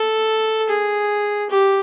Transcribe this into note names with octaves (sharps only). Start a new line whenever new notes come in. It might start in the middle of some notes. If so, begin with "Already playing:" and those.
Already playing: A4
G#4
G4